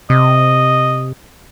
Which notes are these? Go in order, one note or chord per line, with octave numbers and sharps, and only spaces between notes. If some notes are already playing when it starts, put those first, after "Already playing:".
C3 D#5